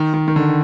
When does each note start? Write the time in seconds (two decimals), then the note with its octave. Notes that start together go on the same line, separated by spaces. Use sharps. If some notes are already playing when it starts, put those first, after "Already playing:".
Already playing: D#3
0.14 D#3
0.28 D#3
0.36 D3